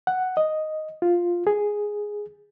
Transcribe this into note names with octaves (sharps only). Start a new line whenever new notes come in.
F#5
D#5
F4
G#4